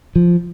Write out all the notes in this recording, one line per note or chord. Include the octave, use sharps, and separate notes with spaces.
F3